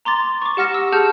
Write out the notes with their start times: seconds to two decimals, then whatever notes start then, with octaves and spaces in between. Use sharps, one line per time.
0.05 A#5 C6 D6 A6
0.42 C#6 D6
0.57 G4 F#5 F6 A#6 E7
0.74 E6
0.92 G#4 F#5 A5 F6 G6 E7